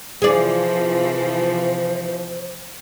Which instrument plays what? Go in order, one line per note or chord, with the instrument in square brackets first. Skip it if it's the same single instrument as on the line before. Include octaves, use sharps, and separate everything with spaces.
[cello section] C3 E3 F3 [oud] G#4 D5 [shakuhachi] C5